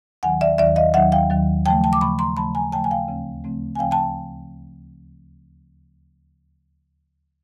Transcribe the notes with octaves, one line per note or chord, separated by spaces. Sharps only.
D#2 D#3 F#3 F#5 G#5
D5 E5
D#2 D#3 F#3 D5 E5
D#5 F5
D#2 D#3 F#3 E5 F#5
F5 G5
D#2 D#3 F#3
C#3 F3 A3 G5 A5
G5 A5
D6
C#3 F3 A3 B5 C#6
A#5 C6
C#3 F3 A3 A5 B5
G#5 A#5
C#3 F3 A3 G5 A5
G#5
F5 G5
D2 C#3 F3 A3 C4
D2 C#3 F3 A3 C4
G#5
D2 C#3 F3 A3 C4 F5 G5
G5 A5